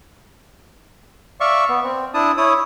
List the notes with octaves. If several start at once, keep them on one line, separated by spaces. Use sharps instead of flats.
D5 E5 F5 C#6
B3
C4
D4 E4 A5 D#6
E4 C#5 D#6